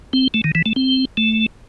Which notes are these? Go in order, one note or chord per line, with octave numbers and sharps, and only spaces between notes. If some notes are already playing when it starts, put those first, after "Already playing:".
C4
A3
D#3
E3
A3
C4
A3